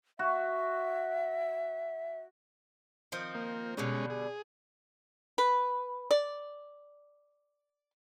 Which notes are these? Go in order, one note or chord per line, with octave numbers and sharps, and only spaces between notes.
F#4 E5
D#3 F3 C4
A#3
B2 D3 G3 G#3 C#4
G#4
B4
D5